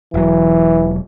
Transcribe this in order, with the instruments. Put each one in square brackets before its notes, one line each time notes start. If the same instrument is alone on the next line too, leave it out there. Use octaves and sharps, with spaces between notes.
[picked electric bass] E1 F#3 [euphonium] E3